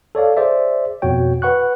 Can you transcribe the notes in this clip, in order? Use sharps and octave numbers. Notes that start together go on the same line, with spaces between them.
A4 C#5 D5 F5
G#4 C5 D5 E5
F2 B2 F#4 C#5 G5
B4 F#5 C#6 F#6